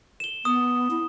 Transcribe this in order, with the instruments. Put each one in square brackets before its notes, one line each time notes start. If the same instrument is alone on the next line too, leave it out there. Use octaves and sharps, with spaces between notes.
[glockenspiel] E7 G7
[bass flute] B3 [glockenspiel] D#6
[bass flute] E4